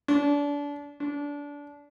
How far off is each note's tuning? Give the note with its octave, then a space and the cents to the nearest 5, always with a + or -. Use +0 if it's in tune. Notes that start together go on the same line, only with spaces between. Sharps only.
D4 -30
D4 -25